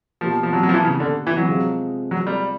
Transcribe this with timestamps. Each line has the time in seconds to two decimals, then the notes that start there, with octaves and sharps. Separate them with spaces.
0.21 B2 F3 G3 A#3
0.43 F3
0.53 F#3
0.63 F#3
0.69 F3
0.74 E3
0.85 C#3
1.00 D3
1.27 E3
1.37 F#3
1.48 C3 F3 G#3
2.11 F#3
2.27 G3